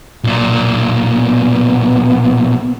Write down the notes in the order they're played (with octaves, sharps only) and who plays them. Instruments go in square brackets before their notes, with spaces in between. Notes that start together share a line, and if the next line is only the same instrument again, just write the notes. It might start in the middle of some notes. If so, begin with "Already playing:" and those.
[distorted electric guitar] B1 A#2
[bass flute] B3